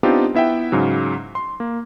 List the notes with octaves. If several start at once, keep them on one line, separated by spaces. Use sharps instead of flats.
B3 C4 D4 D#4 F4 G4
B3 E4 E5 F#5 G5
G#2 C#3 F#3
C6
A#3